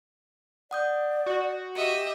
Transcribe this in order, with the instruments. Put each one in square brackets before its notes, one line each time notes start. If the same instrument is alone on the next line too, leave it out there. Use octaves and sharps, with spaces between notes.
[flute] D5 [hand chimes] F#5 D#6 G6
[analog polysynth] F#4
[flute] G4 [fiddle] D#5 E5 [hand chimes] C#7